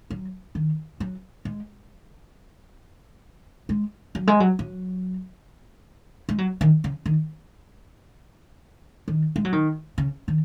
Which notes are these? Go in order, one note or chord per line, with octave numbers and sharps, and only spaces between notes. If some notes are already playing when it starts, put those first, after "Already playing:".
F#3
D#3
F#3
G#3
G#3
F#3
G#3
F#3
F#3
G#3
F#3
D#3
C#3
D#3
D#3
G#3
F#3
D#3
C#3
D#3